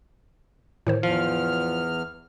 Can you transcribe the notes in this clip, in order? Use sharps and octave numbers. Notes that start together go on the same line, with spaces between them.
A2 D#3 C5
E2 F3 F6